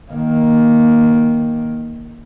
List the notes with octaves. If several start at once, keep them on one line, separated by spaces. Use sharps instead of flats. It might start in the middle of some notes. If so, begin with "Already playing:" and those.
D#3 A#3